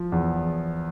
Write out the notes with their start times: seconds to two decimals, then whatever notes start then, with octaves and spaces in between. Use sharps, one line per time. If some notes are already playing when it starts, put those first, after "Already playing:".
Already playing: F3
0.12 E2